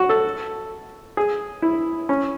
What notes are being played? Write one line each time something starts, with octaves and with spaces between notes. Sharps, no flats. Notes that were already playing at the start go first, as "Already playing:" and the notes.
Already playing: F#4
A4
G#4
E4
C#4